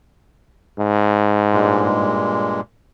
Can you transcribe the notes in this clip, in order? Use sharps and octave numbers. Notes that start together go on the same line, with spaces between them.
G#2
G2 A#2 G#3